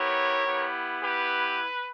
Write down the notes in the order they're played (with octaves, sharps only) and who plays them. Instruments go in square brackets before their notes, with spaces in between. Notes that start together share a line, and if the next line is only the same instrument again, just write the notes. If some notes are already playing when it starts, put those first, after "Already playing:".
Already playing: [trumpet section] B3 E4 G4 A#4 C#5
B3 E4 G4
G4 B4